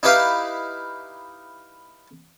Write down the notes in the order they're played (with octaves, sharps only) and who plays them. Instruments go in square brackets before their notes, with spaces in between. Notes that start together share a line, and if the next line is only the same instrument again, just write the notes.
[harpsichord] D#4 E4 G4 B4 F5